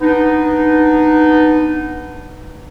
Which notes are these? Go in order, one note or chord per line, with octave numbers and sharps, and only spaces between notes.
B3 D4 D#4